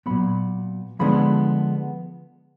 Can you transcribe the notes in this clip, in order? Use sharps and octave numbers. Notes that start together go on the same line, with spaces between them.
A#2 F#3 B3 B5
D3 F3 G#3 B3 D4 B5